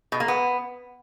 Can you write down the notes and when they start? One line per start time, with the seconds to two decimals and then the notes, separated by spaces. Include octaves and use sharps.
0.12 B2
0.20 A#3
0.28 B3